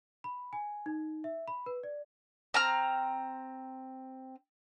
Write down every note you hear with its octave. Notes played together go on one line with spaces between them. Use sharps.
B5
G#5
D#4
E5
B5
B4
D5
C4 A#5 F6